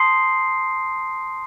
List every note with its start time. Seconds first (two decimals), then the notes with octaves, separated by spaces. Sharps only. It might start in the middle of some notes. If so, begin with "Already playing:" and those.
Already playing: A5 C6 D#6 G6 C7